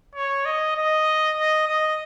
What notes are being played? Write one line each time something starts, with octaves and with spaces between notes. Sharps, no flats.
C#5
D#5
D#5
D#5
D#5